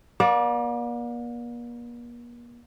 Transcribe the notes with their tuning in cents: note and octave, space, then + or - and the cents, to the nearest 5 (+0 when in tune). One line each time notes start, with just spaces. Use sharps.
A#3 +45 D5 +0